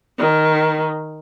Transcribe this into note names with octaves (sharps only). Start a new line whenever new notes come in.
D#3